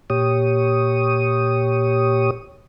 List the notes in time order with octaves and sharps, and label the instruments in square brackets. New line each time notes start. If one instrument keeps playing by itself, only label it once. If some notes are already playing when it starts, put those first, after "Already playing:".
[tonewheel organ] A#2 G4 C#5 D#6